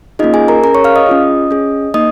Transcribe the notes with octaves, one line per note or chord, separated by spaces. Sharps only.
A#3 C#4 D#4 F4 G#4 D#5
G#4 G#5
A#4 A#5
C#4 G#4 A#4 A#5
C#5 C#6
F5 F6
D#5 D#6
C#4 F4 G#4
C#4 G#4
A#3 D#4 D#5 D#6